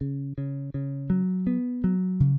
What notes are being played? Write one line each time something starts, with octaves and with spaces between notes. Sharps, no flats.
C#3
C#3
C#3
F#3
B3
F#3
C#3